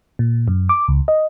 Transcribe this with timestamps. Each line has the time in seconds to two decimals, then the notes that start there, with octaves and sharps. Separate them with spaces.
0.19 A#2
0.48 F#2
0.69 D6
0.88 C#2
1.08 D#5